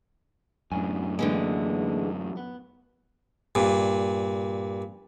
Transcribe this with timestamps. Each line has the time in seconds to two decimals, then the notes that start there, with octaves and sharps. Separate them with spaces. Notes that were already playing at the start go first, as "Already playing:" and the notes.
0.72 F#2 A2 B3 D4 G#5
1.19 D3 E3 G#3 A#3
2.37 B3
3.55 G2 A#2